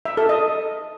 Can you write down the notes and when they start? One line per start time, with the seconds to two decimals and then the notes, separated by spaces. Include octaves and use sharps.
0.05 E5
0.17 A4
0.29 D#5